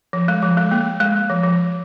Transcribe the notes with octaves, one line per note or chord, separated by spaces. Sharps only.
F3
G#3
F3
G#3
A#3
G#3
F3
F3